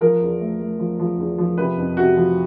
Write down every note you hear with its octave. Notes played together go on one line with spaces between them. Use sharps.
F3 A#4
E2
A3
A3
F3
F3
E2
F3
C3 B4
F2
C3 F#4
F3